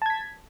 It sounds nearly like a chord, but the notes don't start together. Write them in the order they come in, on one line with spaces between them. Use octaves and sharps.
A5 G#6 B6